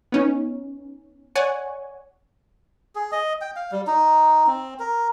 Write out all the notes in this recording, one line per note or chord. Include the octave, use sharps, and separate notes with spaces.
B3 C#4 D#4
C#5 D5 F#5 G#5 C#6
G#4
D#5
G5
F5
G3
D#4
C4
A#4